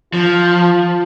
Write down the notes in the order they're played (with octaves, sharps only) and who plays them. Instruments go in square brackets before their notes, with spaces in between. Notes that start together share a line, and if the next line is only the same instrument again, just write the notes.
[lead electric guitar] F3 [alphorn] F4